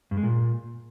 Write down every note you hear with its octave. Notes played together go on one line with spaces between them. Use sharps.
G2
G#3
A#2